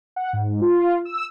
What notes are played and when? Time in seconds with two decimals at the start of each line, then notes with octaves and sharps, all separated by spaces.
0.16 F#5
0.33 G#2
0.61 F4
1.05 E6